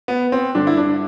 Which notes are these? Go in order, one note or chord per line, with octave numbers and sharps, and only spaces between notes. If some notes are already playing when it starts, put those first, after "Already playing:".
B3
C4
G2 D3 D4
E4
D4